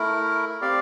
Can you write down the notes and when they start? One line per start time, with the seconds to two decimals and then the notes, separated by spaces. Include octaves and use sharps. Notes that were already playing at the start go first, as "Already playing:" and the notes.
Already playing: A3 E4 A#4
0.61 C4 G4 D5 F5